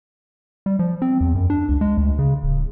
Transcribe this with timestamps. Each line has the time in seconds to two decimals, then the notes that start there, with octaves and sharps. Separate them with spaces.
0.66 G3
0.79 F3
1.02 C4
1.21 E2
1.35 F#2
1.50 D4
1.69 C#2
1.81 G#3
1.98 D2
2.19 C#3
2.43 D1